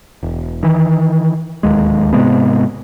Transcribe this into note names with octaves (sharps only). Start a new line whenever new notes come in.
E1
D#3 E3
D1 D#2 G#3
G#2 C3 G#3 B3